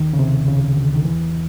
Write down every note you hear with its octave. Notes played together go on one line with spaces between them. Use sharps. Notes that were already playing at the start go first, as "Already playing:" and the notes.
Already playing: D#2 D#3
C#3
C3
C#2 C#3
D2 D3
D#3
E2 E3